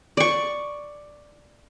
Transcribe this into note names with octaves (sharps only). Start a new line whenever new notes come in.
D5 C#6